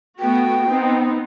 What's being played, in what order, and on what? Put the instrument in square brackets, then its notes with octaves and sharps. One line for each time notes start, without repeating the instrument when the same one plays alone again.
[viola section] A3 B3 F#4 [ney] G5
[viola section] B3 C4 D#4